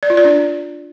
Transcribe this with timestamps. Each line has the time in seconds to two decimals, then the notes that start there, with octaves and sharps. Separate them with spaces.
0.03 D5
0.10 F4
0.17 D5
0.25 D4